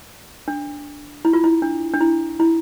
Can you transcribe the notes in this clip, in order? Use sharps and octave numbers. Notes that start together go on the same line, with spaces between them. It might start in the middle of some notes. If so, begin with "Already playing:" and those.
D4
E4
F4
E4
D4
D4
E4
E4